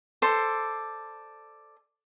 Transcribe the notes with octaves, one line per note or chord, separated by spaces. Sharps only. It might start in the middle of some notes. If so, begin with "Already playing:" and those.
A4 C5 D5 C6